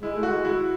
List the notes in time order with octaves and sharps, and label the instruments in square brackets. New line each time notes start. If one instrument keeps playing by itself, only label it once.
[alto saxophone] G#3 [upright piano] E4
[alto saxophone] A3
[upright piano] F#4
[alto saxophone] G#3
[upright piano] E4 [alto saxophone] F#4